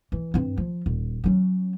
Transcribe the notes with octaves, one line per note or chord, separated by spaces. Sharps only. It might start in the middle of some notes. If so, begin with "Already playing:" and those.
E3
G2 C4
F3
D#1
F#3 C#4